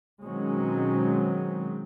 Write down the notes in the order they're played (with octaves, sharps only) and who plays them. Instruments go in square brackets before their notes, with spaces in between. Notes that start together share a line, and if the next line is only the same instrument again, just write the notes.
[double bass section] B2 D#3 F#3 G#3 C4 C#4